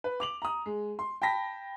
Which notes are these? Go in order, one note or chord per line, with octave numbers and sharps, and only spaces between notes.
B4
D6 F7 F#7
A#5 D#6
G#3
C6
G5 A5 B5 A#6 B6